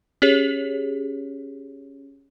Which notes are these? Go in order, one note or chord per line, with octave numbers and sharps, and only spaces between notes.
C#4 G4 G#4 C#5